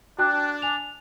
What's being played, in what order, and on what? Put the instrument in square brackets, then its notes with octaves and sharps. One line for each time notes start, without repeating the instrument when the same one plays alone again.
[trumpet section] D4 [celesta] F#4 G5 F#6
[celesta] G#5 F7